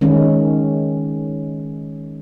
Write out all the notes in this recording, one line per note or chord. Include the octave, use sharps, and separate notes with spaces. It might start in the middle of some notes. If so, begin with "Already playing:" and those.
D#3 G#3 C#4